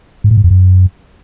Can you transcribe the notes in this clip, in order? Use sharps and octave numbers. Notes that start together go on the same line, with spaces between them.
G#2
A2
G#2
F2
F#2